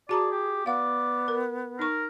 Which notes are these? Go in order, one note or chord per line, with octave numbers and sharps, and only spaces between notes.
F#4 G#4 D5 A5 A#5
G4
B3 D5 F5 F#5
A#4
D#4 A#4 C#6